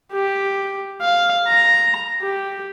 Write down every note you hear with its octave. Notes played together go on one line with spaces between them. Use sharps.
G4
F5
A#5
G4